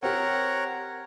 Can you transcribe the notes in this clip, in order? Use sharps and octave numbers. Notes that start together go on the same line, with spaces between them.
C4 G4 A#4 C#5 F#5